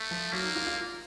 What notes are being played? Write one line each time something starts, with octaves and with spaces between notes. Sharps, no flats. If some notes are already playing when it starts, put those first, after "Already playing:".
Already playing: A3
F3
F#3 A#3
D#4
F4
F4